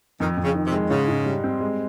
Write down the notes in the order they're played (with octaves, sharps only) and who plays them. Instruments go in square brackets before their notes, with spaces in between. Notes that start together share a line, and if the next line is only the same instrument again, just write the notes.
[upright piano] F2 [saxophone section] D#3
[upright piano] F2
[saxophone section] C#3
[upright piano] D#3
[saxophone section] C3
[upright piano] G#3
[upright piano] G#2 [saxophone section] C#3
[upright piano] G#2
G3
C4
G#3